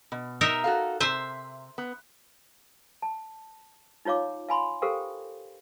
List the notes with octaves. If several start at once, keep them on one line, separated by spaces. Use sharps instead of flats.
B2
D#4 A#4 E5
F#4 A4 F5
C3 C5 E5
B3
A5
D#4 F4 C#5 F5 D6
F5 G#5 B5 C6
G4 A4 A#4 C5 F5 G5